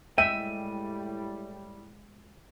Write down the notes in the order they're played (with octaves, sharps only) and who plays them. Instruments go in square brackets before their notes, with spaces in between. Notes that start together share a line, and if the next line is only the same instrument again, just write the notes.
[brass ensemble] A2 G3 [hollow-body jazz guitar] G#3 D#5 G5 [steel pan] E5 [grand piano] D#7